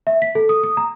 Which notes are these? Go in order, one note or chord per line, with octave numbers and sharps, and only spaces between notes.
E5
B6
A4
D#6
D#6
A#5